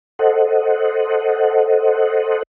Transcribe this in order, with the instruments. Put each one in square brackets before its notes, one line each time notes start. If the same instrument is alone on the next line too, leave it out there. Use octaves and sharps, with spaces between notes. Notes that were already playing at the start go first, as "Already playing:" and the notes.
[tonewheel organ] A4 C5 D#5 F#5